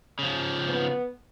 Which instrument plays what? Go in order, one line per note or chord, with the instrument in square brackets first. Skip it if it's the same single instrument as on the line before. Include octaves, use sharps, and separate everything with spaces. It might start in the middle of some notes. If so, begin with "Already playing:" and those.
[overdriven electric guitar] C#3 F3
[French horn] B3